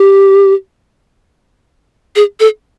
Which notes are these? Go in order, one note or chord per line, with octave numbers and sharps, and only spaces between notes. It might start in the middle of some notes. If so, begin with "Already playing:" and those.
Already playing: G4
G#4
A4